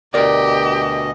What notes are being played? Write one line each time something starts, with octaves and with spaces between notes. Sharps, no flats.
D2 B2 G4 A#4 D5 D#5